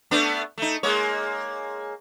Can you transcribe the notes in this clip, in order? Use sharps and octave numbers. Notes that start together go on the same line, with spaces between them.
A3 B3 D4
A3 D#4
G#3 A#3 C#5